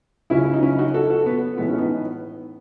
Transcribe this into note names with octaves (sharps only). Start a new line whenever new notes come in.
C#2 C#3 F#3 C#4 E4
D#4
C#4 E4
D#4 F#4
F#4 A4
F#4 A4
B3
A2 E3 G#3 B3
C#4
B3 D#4